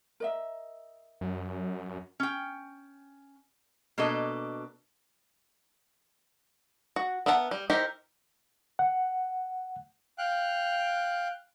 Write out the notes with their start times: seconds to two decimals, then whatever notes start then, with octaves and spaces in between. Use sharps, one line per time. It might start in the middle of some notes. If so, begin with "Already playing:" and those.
0.20 A#4 D#5 E5
1.21 F#2
2.20 C#4 G5
3.98 B2 A#3 D4 A4 D#5
6.96 F#4
7.26 B3 A#4 E5 F#5 A5
7.51 G3
7.70 D#4 E4 G4 A#4 C5
8.79 F#5
10.18 F5 G5 F#6